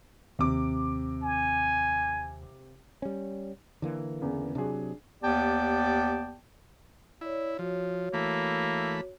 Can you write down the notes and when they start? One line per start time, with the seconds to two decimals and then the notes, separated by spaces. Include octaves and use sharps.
0.39 D#2 C3 D6
1.23 G#5
3.02 G3 C#4
3.82 D3 E3 A#3
4.21 E2 C#3
4.55 C3 F#3 D4 G#4
5.22 D#2 B3 G4 D5 G5 A5
7.21 E4 C#5 D5
7.59 F3 F#4 C#5
8.14 E3 A3 A#3 B5